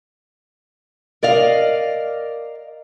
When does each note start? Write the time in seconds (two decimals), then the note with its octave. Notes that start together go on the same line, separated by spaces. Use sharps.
1.23 A#4 D5 D#5 F5